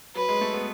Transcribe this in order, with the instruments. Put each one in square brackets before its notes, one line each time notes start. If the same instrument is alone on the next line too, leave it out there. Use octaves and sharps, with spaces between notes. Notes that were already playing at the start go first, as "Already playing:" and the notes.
[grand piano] F#3 [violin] B4
[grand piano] G#3
A3
B3